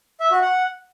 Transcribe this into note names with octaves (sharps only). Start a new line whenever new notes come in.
E5
F#4
F#5